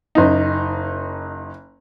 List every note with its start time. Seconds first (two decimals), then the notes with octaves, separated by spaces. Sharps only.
0.15 F#1 D#4